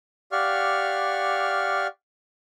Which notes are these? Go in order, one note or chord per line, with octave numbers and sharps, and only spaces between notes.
G4 D5 F5 F#5 C#6 F6